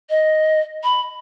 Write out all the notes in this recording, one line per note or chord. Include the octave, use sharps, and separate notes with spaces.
D#5
B5